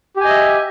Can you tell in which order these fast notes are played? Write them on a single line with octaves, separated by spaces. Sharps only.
G4 G#5 D#5 E5